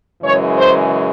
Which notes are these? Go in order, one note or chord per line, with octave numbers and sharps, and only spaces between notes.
F#2 C#3 E3 G#3 C#5
C5